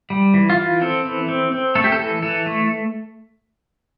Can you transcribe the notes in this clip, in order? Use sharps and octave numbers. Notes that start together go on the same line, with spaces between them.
G3
E3
F4
E3
C4 A4
E3
C4
C4
A3 A4
G4
A4
E3
E3 A4
A3